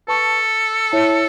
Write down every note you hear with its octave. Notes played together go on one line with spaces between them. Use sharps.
A4 B4 A5 C#6
E4 C#5 E5 A5